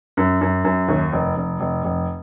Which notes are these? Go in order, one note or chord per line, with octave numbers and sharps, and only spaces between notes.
F#2
F#2
F#2
D#2
F1
F1
F1
F1